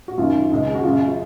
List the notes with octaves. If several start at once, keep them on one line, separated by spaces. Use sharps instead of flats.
F#4
F#2 D#3 F4
C#2 C#3
F#4
F#2 C#3 F4